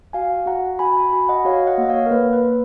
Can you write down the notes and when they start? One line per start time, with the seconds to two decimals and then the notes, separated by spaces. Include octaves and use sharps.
0.13 F#4 F5 G#5
0.46 F#4 F#5 A#5
0.79 F#4 G#5 B5
0.97 G#5 B5
1.12 F#4 G#5 B5
1.29 D#5 F#5
1.45 F#4 C#5 F5
1.67 D#5 F#5
1.78 A#3 D#5
1.89 C#5 F5
2.06 A#4
2.11 A#3 B4
2.33 B4
2.44 A#3